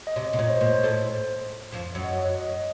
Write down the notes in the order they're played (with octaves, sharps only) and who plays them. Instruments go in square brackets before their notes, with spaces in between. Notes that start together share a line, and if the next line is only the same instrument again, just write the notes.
[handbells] D#5
[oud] C3 [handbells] C#5
[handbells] D#5
[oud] C3
[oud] A#2 [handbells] C#5
[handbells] C5
[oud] A#2 [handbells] C5
[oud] A2 A3
[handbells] C5
[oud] F2 F3
[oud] F#2 F#3 [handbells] C#5
[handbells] D#5
C#5
D#5